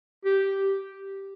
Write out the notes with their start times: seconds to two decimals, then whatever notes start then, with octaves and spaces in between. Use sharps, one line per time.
0.25 G4